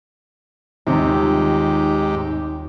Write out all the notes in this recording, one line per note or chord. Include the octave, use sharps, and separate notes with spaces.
D#1 D#2 G#2 C3 D#4 G4